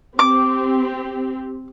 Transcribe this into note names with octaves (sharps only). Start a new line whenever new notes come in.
C4 G4 D6